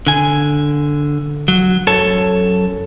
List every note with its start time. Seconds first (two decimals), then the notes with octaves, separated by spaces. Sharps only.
0.07 D3 G#5
1.48 F#3
1.87 F#2 A4 C#5 A5